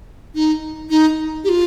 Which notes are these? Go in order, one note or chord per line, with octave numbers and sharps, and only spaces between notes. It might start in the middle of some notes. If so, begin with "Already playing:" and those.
D#4
D#4
G4
F4